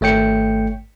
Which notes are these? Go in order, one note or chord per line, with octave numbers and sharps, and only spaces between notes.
G#1 A3 C#5 G5 C#7